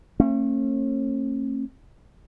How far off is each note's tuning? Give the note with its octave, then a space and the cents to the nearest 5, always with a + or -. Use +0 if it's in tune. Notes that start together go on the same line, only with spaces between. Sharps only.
A3 +45 C#4 -40